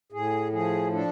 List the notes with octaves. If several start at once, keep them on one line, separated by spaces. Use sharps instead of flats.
A2 G#4
F3 G#4
D4 A4